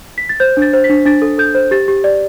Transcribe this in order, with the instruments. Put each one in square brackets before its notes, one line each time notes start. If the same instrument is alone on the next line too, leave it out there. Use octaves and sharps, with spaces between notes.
[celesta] B6
A6
C5 G6
D4
A6
C5
B6
D4
D4 A6
A4
A4 G6
C5
G4 A6
G4
D5